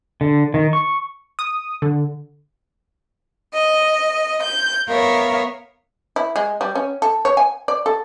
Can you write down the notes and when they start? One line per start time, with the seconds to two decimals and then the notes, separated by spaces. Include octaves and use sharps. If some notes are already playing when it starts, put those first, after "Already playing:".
0.21 D3
0.54 D#3
0.73 C#6
1.39 D#6
1.82 D3
3.53 D#5
4.43 G6
4.87 B3 A#4 C#5 E5 F5
6.16 E4
6.36 G#3
6.61 G3
6.75 C#4
7.02 A4
7.25 C#5
7.37 G#5
7.68 D5
7.86 A4